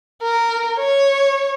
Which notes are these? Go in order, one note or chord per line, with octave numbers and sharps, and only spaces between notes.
A#4
C#5